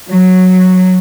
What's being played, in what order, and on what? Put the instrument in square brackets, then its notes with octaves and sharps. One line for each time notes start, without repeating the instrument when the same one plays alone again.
[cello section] F#3